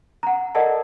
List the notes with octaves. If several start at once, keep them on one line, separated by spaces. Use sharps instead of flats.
F#5 A#5
A4 A#4 D5 D#5 F#5 A5